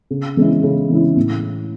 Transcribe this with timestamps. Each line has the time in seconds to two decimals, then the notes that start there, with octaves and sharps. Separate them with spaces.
0.10 C#3
0.37 E3 G#3 C#4 E4
0.64 C#3
0.90 E3 G#3 C#4 E4
1.16 A2